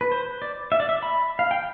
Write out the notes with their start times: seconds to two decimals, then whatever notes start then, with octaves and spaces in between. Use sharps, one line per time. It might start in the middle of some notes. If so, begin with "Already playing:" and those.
0.01 B4
0.12 C5
0.42 D5
0.72 E5
0.80 D5
0.89 E5
1.03 B5
1.39 F5
1.51 G5